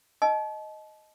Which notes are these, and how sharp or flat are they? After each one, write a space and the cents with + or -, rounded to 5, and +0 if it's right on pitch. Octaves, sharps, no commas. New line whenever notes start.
D#5 +0 A5 -30